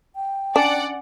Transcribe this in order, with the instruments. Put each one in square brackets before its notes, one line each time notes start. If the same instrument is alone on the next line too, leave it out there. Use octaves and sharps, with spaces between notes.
[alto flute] G5
[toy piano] C#4 G#5 [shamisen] D4 [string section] D5 F#5